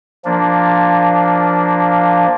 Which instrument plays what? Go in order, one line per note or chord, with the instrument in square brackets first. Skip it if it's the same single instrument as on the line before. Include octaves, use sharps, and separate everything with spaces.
[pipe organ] F3 A#3 D4